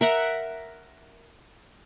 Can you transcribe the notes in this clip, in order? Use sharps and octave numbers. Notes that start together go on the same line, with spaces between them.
A#4 E5 F#5